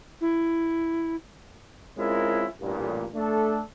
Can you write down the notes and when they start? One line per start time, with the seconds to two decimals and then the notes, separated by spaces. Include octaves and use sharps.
0.21 E4
1.98 G#3 C4 C#4 E4 F4 A#4
2.60 A1 G2 A#2
3.14 A3 D4 A4